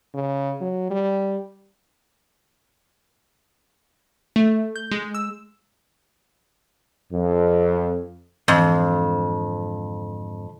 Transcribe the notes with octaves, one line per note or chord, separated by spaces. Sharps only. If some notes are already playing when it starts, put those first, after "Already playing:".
C#3
F#3
G3
A3
G6
G#3
E6
F2
F2 G#2 D3 E3 C4